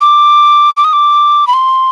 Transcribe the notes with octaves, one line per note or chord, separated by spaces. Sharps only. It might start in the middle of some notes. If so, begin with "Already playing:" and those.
D6
D6
D#6
D6
B5
C6